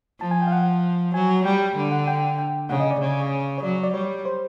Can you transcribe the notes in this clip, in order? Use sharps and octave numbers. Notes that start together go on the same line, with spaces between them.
F3 A5
G#5
G5
F5
F#5
F#3 G#5
G3 G5
D3
F#5
G5
G5
C#3 F#5
D#5
D5
C#3
C#5
F#3 D5
D5
G3 C#5
C5